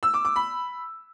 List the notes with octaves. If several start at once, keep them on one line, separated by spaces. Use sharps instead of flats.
E6
D6
D6
B5